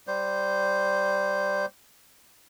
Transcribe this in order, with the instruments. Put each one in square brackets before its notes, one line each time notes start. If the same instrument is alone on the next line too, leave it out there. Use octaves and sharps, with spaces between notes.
[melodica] G3 C5